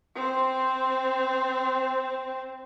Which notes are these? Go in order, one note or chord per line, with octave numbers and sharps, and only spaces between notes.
C4 C5